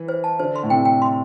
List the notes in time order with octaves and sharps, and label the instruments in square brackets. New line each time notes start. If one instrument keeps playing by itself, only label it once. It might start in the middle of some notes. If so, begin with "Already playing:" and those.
Already playing: [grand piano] E3
[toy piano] C5
A5
[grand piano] D3 [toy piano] C5
[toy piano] C6
[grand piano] A2
[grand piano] C3 [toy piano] G5
[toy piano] G5
C6